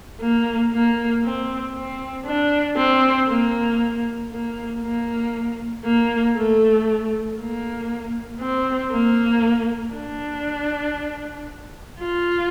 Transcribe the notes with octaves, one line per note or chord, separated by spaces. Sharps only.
A#3
A#3
C4
C4
D4
C4
A#3
A#3
A#3
A#3
A3
A#3
C4
A#3
D4
F4